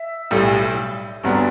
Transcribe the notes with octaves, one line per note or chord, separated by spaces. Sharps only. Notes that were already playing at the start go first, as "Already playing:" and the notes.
Already playing: E5
B1 A2 G3
G1 G2 F#3 B3 D4